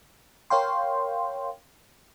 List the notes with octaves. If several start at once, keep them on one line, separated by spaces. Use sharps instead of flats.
A#4 C#5 F5 G5 C6